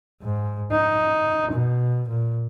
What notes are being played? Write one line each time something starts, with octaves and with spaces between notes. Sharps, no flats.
G#2
D#4
B2
A#2